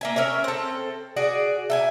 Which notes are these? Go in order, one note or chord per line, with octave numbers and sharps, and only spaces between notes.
A#3 E5 G#5
C#4 A#4 C#5 E5
C4 A4
F#4 G#4 D5
E5 G5 G#5